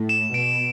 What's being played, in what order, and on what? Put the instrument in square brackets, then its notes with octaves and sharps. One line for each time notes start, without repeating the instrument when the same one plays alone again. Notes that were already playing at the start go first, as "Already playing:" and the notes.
Already playing: [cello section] A2
[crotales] E7
[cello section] B2 [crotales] D7